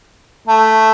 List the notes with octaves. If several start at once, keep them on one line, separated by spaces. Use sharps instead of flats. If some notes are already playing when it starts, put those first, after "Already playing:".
A3